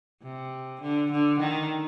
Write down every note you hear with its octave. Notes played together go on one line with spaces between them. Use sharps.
C3
D3
D3
D#3